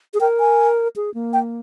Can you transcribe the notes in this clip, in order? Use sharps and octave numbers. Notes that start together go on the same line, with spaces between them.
G#4
A#4 G5
G#5
G#4
A#3
G5